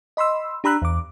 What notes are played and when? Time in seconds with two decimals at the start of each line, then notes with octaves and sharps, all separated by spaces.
0.17 D#5 B5 C6 E6
0.64 D4 G4 A#5 B5 E6 F#6
0.82 E2 D6